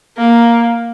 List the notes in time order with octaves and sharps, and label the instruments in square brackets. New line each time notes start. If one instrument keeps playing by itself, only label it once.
[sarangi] A#3